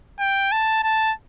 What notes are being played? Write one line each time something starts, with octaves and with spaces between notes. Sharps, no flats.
G5
A5
A5